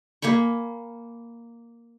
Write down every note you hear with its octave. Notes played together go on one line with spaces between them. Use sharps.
A#3 G#5 B5 C#6